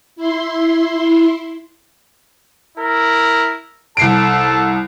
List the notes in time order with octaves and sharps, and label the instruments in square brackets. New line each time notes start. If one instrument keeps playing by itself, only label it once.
[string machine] E4 C6
[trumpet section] E4 A#4
[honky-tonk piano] C2 C7 D7 [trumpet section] A4 A5